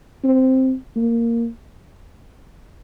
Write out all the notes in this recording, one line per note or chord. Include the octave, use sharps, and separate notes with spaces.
C4
A#3